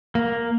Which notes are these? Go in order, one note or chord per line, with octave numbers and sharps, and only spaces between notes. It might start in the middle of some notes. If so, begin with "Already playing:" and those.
A#3